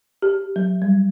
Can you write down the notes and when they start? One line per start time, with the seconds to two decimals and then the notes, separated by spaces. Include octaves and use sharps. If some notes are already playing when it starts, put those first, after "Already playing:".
0.22 G4
0.56 F#3
0.82 G3